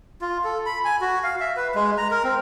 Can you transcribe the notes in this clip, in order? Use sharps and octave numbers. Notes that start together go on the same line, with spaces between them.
F4
A4
B5
G#5
F#4
F5
E5
B4
G#3
A#5
A#4
C4